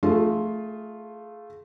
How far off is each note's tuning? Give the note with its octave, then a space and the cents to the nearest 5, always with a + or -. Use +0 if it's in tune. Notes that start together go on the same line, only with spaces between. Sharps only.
A3 +0 F4 +0 G#4 +25